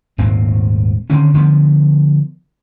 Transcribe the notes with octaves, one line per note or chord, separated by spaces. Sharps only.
D#1 G#2 A#3 C4
D3 D#3 C4 C#4
D3 F3 A#3 B3